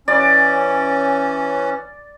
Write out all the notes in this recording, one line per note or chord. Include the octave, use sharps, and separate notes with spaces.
E3 C#4 D5